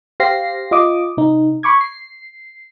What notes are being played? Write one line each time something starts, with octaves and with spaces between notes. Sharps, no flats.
G4 C5 F5 A#6 C7
F4 D#5 D6 D#6
C3 D#4
B5 C#6 D6 G#6
C7